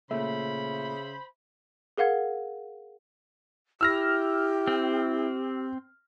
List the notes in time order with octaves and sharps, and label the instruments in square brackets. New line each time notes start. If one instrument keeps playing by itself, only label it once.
[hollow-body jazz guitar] A#2 A3 [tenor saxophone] C#3 [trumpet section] C5 B5 [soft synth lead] E5
[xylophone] G#4 A#4 F5 F#5 G#6
[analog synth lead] E4 [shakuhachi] G4 [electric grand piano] E6 F6 A#6
[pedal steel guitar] C4